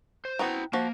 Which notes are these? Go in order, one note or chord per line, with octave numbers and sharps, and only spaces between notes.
C5
B3 C4 E4 F#4 A#5
F3 A#3 F#4